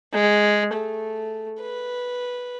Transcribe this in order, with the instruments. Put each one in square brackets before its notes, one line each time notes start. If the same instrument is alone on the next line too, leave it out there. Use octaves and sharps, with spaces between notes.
[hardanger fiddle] G#3
A3
B4